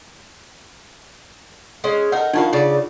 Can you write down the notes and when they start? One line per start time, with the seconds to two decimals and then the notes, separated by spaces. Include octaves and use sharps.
1.84 G#3 C#4
2.12 D#4 A4 A#4 F#5
2.33 D#3 D4 D#4 F4 F#4 F5
2.53 C#3 D5